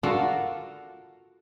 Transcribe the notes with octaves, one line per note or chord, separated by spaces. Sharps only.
F4 F#4 A4 A#4 D5